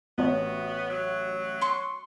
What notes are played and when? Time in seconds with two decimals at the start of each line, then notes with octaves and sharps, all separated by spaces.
0.18 A1 B3 F#4 C#5
0.90 F#3
1.61 C6 C#6